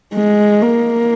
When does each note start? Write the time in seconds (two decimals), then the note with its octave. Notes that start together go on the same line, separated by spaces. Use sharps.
0.15 G#3
0.62 A#3